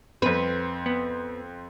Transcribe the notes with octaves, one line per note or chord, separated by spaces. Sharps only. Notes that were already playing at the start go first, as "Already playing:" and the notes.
F2 C4 B4
B3